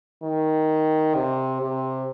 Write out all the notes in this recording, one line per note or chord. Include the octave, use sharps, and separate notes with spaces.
D#3
C3
C3